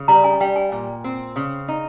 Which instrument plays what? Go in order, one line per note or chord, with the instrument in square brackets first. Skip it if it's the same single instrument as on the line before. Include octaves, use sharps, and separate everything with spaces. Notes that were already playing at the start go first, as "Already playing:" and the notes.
Already playing: [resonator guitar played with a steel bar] C#3
[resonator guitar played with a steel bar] G3 [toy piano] A#5
[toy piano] G#5
[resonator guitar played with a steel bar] G3 [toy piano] G5
[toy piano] G#5
[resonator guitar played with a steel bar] A#2
C4
C#3
D#4